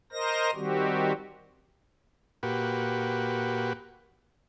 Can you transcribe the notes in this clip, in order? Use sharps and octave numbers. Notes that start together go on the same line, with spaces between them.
A#4 C5 D#5 A#6
D#3 G3 C4 F#4 G4
A#2 F#4 G4 B4